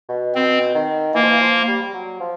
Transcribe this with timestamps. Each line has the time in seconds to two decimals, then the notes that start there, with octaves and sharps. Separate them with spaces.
0.09 B2
0.35 B2 C4
0.75 D#3
1.14 E3 A#3
1.22 F3
1.30 E3
1.41 F3
1.68 G3
1.82 G3
1.94 F#3
2.20 F3